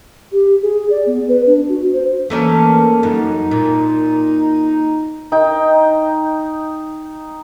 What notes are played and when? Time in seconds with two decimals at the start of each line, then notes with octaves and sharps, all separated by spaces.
0.32 G4
0.62 G#4
0.90 D5
1.06 B3
1.28 B4
1.47 D4
1.69 F#4
1.93 C5
2.30 E3 A3 A#3 C#4
3.03 F#2 D#4
3.51 A#2
5.32 D#4 G5